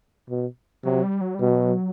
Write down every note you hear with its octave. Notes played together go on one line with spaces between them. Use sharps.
B2
C3 F#3
G3
F#3
G3
B2
F#3